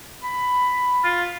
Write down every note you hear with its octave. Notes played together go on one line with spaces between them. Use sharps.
B5
F4